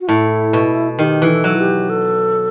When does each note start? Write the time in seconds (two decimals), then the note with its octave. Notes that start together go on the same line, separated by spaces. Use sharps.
0.01 F#4
0.08 A2 E4
0.53 B2
0.99 D#3 G4
1.22 E3
1.28 A4
1.44 F#3
1.59 G4
1.90 A4